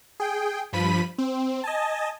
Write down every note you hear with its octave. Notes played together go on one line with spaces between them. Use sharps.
G#4 G5
G2 F3 B5 B6 D#7
C4
D#5 G#5 A5